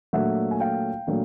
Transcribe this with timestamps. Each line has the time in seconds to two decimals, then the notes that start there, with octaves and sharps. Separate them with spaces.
0.13 A#2 F#3 A3 D4 E5 F#5
0.51 G#5
0.60 F5 G5
1.07 A#2 F#3 A3 D4